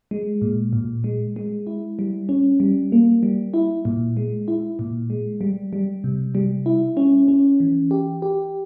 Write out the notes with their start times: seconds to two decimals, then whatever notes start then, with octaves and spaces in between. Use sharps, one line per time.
0.11 G#3
0.42 A#2
0.73 A#2
1.04 G#3
1.36 G#3
1.67 E4
1.99 G3
2.29 C#4
2.60 G3
2.92 A#3
3.23 G3
3.54 E4
3.85 A#2
4.17 G#3
4.48 E4
4.79 A#2
5.10 G#3
5.41 G3
5.73 G3
6.04 C3
6.35 G3
6.66 E4
6.97 C#4
7.28 C#4
7.60 E3
7.91 G4
8.22 G4